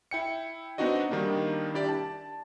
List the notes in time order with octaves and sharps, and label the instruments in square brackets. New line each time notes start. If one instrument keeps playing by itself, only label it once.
[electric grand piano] E4 G5 C#7
B3 C4 D4 D#4 F#4 D#5
D#3 G3 A#3 D4 D#4
D4 E4 G4 D5
A5